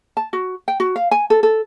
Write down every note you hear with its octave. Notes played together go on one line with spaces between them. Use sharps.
A5
F#4
G5
F#4
F5
G#5
A4
A4